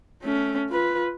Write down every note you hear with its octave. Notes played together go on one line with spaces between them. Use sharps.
A3 C#4
F4 B4